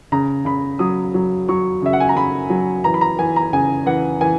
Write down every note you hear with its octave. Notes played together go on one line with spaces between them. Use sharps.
C#3 A#5
C#3 B5
F#3 D#6
F#3
F#3 C#6
C#3 E5
F#5
G#5
A#5
C#3 B5
F#3
E3 A#5
B5
A#5
E3 G#5
A#5
C#3 G#5
E3 F#5
E3 G#5